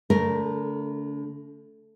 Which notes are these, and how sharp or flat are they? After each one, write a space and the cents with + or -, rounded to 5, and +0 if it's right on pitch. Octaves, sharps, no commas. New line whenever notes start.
D3 -40 A3 +0 A#4 +0